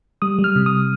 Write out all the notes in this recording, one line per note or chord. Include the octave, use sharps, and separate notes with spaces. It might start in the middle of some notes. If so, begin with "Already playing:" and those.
G3 D#6
G3
F6
C3
D#6